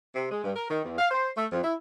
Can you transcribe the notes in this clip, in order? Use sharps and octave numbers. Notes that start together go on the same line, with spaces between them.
C3
G#3
G2
A#4
D#3
E2
F5
C5
A3
F2
E4